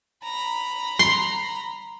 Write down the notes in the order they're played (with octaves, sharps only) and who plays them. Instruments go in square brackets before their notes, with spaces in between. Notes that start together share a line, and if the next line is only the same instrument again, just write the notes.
[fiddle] A#5 B5
[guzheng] C6